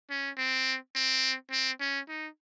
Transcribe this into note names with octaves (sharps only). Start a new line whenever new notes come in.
C#4
C4
C4
C4
C#4
D#4